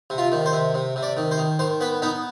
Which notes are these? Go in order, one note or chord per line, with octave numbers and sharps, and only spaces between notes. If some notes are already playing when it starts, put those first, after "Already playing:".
C3
F4
D#3
C5
C3
C3
C3
D5
D#3
C5
D#3
D#3 C5
B3 B4
B3 D#4